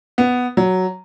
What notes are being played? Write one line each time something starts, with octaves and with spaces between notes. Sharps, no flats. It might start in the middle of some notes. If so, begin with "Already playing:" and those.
B3
F#3